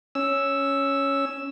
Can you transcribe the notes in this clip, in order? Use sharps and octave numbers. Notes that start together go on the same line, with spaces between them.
C#4 E6